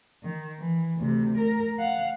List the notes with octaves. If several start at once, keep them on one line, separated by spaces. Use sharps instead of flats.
D#3
E3
D2 C3
A#4
F5 F#5